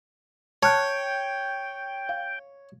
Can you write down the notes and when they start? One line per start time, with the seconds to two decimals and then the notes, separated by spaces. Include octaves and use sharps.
0.63 C#5 G5 A5 F6 F#6
2.09 F5